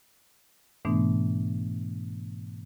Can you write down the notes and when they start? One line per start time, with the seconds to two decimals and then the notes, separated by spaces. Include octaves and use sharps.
0.85 G#2 B2 E3 A3 B3 D4